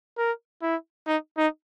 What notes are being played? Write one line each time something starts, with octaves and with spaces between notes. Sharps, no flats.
A#4
E4
D#4
D#4